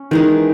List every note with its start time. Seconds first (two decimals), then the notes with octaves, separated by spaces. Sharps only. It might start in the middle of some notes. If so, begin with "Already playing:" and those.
Already playing: C#4
0.11 D#3 E3 G#3 D#4